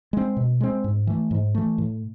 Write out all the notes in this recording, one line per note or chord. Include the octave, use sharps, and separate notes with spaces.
G#3 C4
B2
G#3 C4
G#2
E3 A3
G#2
E3 A3
A2